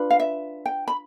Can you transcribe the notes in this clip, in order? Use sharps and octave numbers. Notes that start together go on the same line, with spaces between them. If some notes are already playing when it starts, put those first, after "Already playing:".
Already playing: D4 F4 B4
F5
E5
G5
B5